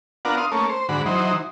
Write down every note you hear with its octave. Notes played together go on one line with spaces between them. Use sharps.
B3 D4 F4 A#4 F#5
F5 C6 D#6
A3 A#3 C#4
C5
G#2 D3 F#4 B5
E3 F#3 D#4 C5